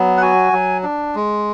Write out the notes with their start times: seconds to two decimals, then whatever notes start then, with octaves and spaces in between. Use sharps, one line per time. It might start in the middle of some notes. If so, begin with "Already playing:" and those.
Already playing: F#3 B3
0.17 F#5
0.22 F#4 G#5
0.53 F#3
0.83 D4
1.15 G#3